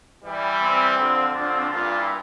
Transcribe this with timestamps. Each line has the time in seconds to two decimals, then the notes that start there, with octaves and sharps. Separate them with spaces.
0.25 E3 G3
0.61 C4
0.98 D3 F3
1.35 D3 F3 D4
1.47 C4
1.60 D4
1.71 G2 A#2 F4
1.98 E4